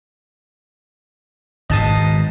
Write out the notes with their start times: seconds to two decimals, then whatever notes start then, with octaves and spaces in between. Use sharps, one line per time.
1.70 G#1 G#2 B2 D#5 A5 D#6